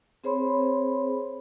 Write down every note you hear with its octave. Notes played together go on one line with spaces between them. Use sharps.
C4 G#4 C5 C#5 B5 C6